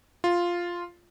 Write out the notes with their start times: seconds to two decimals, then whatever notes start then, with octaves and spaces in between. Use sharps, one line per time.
0.24 F4